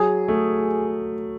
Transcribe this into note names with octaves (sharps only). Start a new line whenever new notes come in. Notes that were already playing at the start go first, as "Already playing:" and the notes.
Already playing: F#3 G#4
A3